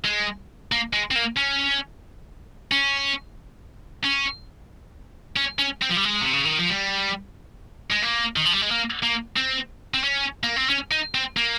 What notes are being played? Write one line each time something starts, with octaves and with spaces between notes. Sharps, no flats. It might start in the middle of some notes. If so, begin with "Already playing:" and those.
G#3
A#3
G#3
C4
A#3
C#4
C#4
C#4
C#4
C#4
C4
F3
G3
G#3
C3
C#3
D#3
F3
G3
G#3
A#3
D#3
F3
G3
G#3
A#3
A#3
C4
C4
C#4
A#3
C4
C#4
D#4
C4
A#3